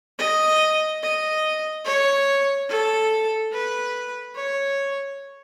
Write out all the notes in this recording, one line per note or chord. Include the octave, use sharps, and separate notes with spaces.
D#5
D#5
C#5
A4
B4
C#5